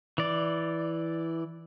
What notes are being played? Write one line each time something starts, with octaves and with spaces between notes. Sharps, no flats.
E3 D5